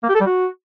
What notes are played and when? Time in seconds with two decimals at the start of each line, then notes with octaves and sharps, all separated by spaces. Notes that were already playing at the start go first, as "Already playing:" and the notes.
0.03 A#3
0.09 G4
0.15 A4
0.21 G3
0.27 F#4